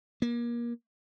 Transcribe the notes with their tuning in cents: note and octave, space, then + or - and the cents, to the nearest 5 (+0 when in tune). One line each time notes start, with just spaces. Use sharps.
A#3 +30